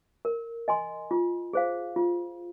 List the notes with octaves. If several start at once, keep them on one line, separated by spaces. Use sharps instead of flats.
A#4
D#5 G#5 C6
F4
G#4 C5 F5
F4